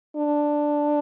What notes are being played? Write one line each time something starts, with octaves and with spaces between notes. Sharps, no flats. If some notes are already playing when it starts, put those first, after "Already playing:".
D4